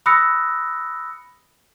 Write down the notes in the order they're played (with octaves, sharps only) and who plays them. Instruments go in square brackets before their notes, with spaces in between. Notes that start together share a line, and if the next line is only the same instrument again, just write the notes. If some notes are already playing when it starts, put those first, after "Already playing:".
[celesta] B5 D#6 E6 F#6 A#6 C#7